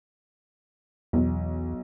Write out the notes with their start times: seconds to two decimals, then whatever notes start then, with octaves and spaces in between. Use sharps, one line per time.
1.13 B1 E2